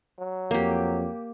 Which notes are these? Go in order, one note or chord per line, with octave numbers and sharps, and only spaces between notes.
F#3
F2 A#3 G4